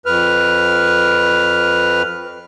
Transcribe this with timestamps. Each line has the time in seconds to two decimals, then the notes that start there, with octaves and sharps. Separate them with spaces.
0.06 F2 B4 F6